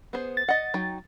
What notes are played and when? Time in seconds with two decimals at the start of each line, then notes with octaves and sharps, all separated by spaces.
0.13 B3 G#4 C5
0.37 A6
0.48 D#5 F#5
0.74 F#3 D#4 G5